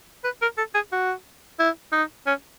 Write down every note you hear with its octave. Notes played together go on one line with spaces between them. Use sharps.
B4
A#4
A4
G#4
F#4
E4
D#4
C#4